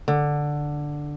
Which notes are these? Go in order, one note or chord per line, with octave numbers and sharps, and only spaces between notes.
D3